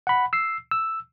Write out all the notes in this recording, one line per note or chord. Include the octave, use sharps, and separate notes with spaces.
F#5 B5
E6 C7
E6